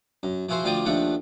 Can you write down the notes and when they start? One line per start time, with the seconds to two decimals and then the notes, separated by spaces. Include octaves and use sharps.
0.23 F#2
0.49 F3 E4 F#4 G#4 C5
0.64 D2 F3 F4 D5 G5 D#6
0.86 D#2 F3 A3 D4 F#5